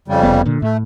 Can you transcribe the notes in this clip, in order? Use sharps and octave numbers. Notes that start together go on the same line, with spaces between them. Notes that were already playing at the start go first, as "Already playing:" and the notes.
F2 C#3 G3
F1 B3
A#2 D3
A2 A3